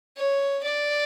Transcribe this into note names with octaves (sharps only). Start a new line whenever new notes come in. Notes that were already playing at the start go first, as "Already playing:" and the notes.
C#5
D5